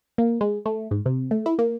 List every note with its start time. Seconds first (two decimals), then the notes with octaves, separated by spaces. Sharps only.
0.18 A#3
0.41 G#3
0.66 A3
0.91 G#2
1.06 C3
1.31 A3
1.46 E4
1.59 A#3